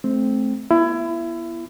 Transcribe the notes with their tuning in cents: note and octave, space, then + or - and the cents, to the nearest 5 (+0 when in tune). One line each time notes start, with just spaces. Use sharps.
A3 -25 C4 +0
B3 -25 E4 +25